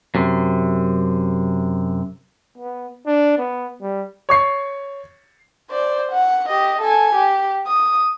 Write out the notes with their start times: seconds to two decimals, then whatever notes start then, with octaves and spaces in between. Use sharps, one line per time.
0.15 F#2 C3
2.58 B3
3.06 D4
3.38 B3
3.81 G3
4.29 C#5 C#6 C7
5.70 C5 D5
6.12 F#5
6.49 G4 D#5
6.81 A4 G#5
7.16 G4
7.67 D#6